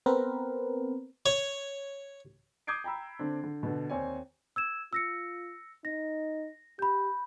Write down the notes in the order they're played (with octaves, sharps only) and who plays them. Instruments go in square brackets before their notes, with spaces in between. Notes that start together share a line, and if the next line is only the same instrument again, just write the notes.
[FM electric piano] B3 C4 A#4 B4
[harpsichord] C#5
[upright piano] D6 D#6 G6 G#6 C7 D7
G5 A#5 B5 E6
D3 C4 D4
D3
B2 D3
D#2 C4 C#5 D5 G#5
[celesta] E6 G#6 E7
[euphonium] F4 [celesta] E6 A#6 C#7
[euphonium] D#4 [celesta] A#6
[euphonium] G4 [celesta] B5 G6